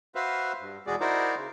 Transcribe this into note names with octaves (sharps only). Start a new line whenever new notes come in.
F#4 B4 C5 E5 F5
G2
E2 B2 G#3 F#4 G#4 D5
D#4 E4 F#4 A#4 C5 D5
C#3